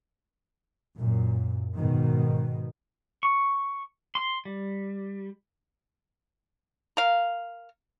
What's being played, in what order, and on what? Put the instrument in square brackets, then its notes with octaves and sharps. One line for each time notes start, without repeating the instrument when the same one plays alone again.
[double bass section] F#2 A#2
G#2 B2 D#3
[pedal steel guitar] C#6
C6
G3
[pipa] A#4 F5